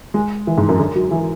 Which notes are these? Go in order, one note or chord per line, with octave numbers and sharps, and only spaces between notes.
G#3
E3
G#2
F#2
D3
F#3
E3